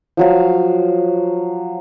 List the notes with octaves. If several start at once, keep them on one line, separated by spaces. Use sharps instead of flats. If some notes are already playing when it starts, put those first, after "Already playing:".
F3 F#3 F5